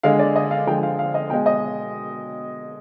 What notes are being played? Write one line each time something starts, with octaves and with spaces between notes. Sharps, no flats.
D3 G#3 F5
D5
D#5
F5
D3 F3 G#3 G5
F5
F5
D#5
B2 G#3 G5
D#5